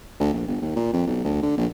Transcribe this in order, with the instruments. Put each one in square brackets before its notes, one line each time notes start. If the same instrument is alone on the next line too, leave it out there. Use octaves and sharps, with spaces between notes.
[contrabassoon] D2
A#1
G1
D#2
A#2
F2
B1
D2
D3
A#1